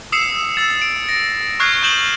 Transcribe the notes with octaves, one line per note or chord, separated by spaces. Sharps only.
D#6 E6 C7 C#7 E7
E6 A6 E7
D7
A#6
C#6 D#6 F6 F#6 G#6 C7
C#6 G6 D7 E7 F#7 G7